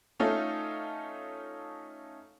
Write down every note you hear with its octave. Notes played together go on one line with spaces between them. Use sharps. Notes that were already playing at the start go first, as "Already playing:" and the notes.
A3 C#4 D#4 F4 A4 F5